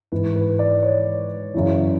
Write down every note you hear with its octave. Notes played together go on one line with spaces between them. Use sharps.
G#2 E3 B4
B4
D5
C#5
F#2 C#3 E3